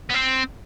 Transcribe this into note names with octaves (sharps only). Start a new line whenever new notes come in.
B3
C4